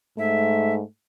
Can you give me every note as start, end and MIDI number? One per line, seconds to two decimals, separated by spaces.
0.18 0.82 44
0.18 0.84 57
0.18 0.73 76